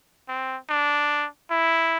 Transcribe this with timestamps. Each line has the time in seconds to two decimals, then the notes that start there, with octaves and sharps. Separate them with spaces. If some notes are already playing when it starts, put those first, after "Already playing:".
0.29 C4
0.70 D4
1.51 E4